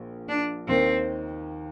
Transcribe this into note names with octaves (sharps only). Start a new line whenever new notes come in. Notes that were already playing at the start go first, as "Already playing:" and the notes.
Already playing: A#1 A#2 F3
D4
D#2 D#3 A#3 C4